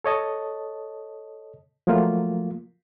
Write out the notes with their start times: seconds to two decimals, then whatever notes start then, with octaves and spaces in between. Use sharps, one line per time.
0.04 A4 C#5 D#5 A5
1.87 F3 F#3 A3 A#3 F4